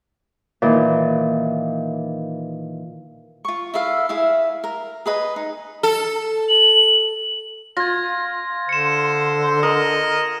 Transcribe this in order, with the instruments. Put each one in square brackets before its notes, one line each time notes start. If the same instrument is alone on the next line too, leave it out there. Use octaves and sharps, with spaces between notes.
[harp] A#2 D#3 E3
[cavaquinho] F4 C#6
E4 A4 E5 F5
E4 G#4 E5 F5
A#4
G#4 B4 D#5 B5
D#4
[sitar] A4
[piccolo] F#7
[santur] F4 [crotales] G#6 A#6
[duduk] D3 [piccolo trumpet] C5 [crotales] C#7 E7
[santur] A#4 [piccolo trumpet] D#5 [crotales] D#6